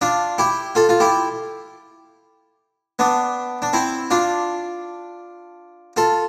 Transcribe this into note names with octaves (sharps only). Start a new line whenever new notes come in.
D4 F4
E4 G4
F4 A4
F4
E4 G4
B3 D4
D4
C4 E4
D4 F4
F4 A4